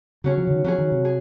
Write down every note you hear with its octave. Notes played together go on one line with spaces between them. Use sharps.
C#3 F#3 C#4 G#4
F3
C#3
D#3
F3 F#3 C#4 G#4
D#3
C3
G#4